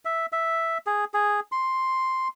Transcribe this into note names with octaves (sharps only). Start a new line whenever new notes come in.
E5
E5
G#4
G#4
C6